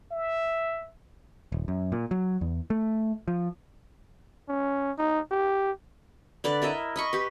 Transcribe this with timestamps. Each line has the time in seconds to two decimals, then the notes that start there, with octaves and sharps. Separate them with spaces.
0.11 E5
1.52 D#1
1.68 F#2
1.92 A#2
2.11 F#3
2.41 E2
2.70 A3
3.28 F3
4.49 C#4
4.98 D#4
5.31 G4
6.44 D3 B4 D5
6.62 E4 A#4 D#5 E5
6.96 D#5 B5 C#6
7.13 G4 B4